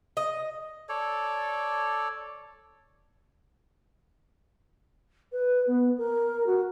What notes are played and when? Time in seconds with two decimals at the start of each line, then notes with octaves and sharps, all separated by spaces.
0.17 D#5
0.89 A4 C#5 D5
5.32 B4
5.67 B3
5.98 A#4
6.47 F#4